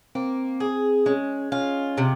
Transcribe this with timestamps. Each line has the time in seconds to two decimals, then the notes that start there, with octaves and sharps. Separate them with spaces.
0.15 A#3 C4
0.60 G#4
1.06 G#3 C#4
1.52 C#4 F4
1.98 C3 C4